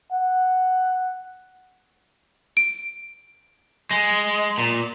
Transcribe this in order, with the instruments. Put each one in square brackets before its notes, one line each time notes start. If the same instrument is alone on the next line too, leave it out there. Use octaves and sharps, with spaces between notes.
[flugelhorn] F#5
[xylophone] D7
[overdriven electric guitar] G#3
A#2